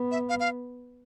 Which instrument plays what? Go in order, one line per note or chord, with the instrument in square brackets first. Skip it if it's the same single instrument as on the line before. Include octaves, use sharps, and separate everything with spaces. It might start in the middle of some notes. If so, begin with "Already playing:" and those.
Already playing: [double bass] B3
[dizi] E5
F5
F5